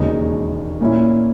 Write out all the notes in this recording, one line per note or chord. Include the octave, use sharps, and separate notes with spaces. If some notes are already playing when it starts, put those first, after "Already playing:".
Already playing: E1 D#2 C#3 G#3 D#4
A#2 A#3 C#4 E4